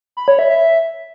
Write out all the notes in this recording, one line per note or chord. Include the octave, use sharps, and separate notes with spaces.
B5
C#5
E5
E5